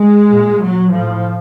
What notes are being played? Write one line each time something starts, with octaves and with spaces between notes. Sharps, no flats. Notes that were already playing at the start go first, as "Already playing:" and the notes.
Already playing: G#3
A#2
F#3
A2 F3